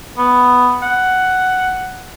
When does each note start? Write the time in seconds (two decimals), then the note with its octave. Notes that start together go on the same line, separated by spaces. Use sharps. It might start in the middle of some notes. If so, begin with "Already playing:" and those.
0.18 B3
0.82 F#5